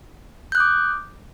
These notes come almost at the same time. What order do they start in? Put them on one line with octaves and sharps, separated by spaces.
G6 F#6 D#6 D6